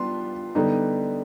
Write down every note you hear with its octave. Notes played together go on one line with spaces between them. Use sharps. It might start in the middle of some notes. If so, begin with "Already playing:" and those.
Already playing: G3 B3 D4 F4 C6
D3 G3 B3 D#4